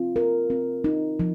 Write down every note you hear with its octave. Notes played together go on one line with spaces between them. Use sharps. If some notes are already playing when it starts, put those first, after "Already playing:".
Already playing: C4 F4
A#4
C4
D#4
F3